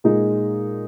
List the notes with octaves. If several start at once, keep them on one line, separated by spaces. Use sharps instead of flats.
A#2 G#3 D#4 G#4